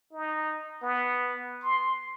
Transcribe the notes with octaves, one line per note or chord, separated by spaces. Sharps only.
D#4
B3
C6